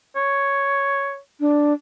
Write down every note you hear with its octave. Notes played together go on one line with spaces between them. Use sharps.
C#5
D4